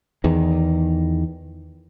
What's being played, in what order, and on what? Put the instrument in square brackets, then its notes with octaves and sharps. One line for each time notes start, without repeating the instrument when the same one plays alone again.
[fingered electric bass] E2 D#3